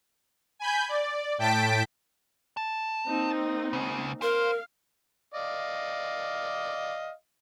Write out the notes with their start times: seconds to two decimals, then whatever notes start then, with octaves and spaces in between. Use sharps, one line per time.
0.59 G#5 B5 G6
0.89 D5
1.38 A2 G5 A5 B6 D7
2.57 A5
3.08 A#3 C4 D#4
3.73 C#2 C#3
4.22 A#4 C5 F5
5.34 D5 D#5 F5